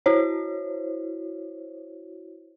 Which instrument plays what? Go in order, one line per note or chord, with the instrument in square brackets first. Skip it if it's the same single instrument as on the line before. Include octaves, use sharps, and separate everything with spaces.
[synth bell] E4 F#4 C5 C#5